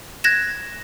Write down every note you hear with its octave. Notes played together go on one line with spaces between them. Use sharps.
F#6 G#6 A#6 E7